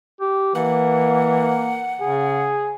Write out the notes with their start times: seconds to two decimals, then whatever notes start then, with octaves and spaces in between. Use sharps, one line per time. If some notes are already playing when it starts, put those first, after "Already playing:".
0.21 G4
0.55 E3 A#3 F#5
2.00 C#3 G#4